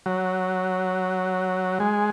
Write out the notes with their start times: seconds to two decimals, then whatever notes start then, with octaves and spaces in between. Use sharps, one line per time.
0.06 F#3
1.80 G#3